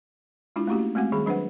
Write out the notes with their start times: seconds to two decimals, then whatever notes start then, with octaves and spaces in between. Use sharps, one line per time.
0.56 G#3 D4 E4 F4
0.67 A3 A#3 C#4 E4 F#4 G4
0.79 E4
0.95 G#3 A3 C4 F#4 F#5
1.12 D#3 G3 G#4 B5
1.26 F#3 D4 B4 C5 F#5